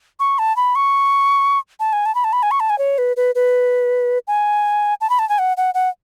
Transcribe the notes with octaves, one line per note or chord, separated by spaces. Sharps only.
C#6
A5
B5
C#6
A5
G#5
A5
B5
A5
B5
G#5
C#6
A5
G#5
C#5
B4
B4
B4
G#5
A5
B5
A5
G#5
F#5
F#5
F#5